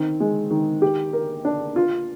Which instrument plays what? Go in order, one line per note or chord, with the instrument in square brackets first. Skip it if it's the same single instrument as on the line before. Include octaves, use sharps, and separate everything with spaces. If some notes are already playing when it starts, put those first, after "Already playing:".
Already playing: [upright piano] D#3 C4
G#3
D#3
G4
A#4
D4
F4